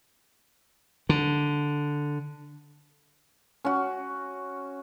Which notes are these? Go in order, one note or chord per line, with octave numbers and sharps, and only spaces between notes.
D3
C#4 F#4